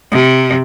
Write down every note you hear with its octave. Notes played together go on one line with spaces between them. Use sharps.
C3